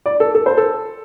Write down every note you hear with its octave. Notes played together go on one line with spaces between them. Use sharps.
D5
A4
A4
C5
A4